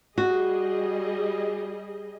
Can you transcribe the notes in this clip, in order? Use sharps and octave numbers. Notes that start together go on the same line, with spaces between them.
G3 F#4 G#4 D#5